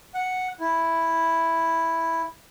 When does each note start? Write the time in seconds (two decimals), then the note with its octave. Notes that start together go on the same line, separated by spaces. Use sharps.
0.14 F#5
0.60 E4